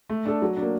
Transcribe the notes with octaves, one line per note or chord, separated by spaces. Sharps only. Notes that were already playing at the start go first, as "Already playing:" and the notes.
A3
D4 A4
F#3
D4
A#3